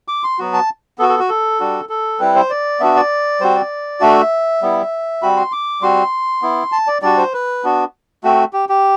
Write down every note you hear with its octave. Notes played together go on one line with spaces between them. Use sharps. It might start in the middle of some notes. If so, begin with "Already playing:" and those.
D6
C6
F#3 B3 F#4
A5
B3 F#4 A4
A4
F#4
A4
G3 D4 F#4
A4
G3 C4 E4 B4
C5
D5
B3 D4 F#4 E5
D5
G3 C4 F#4 C5
D5
A3 D4 F#4 E5
G3 B3 E4
G3 C4 F#4 B5
C6
D6
G3 C4 F#4 C6
B3 E4
A5
D5
G3 D4 F#4 D5
C5
B4
B3 D4 F#4
A3 C4 F#4
G4
G4